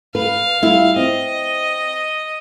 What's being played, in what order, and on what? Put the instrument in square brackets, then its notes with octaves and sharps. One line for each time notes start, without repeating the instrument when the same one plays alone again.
[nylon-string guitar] B4 [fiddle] F5
[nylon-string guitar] G3 E4 F4
[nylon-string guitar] C4 [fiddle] D#5